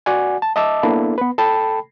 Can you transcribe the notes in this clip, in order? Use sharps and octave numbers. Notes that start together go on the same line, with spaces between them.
F#4 D5 F#5 G#5
A5
D#5 E5 A5 D6 E6
A#3 B3 D4 E4 A4
B3 B4
A4 G5 A5 B5